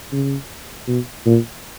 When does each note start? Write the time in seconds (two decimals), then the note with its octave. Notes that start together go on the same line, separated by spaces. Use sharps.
0.12 C#3
0.88 B2
1.26 A#2